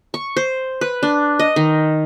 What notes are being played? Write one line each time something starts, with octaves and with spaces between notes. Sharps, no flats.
C#6
C5
B4
D4
D#5
D#3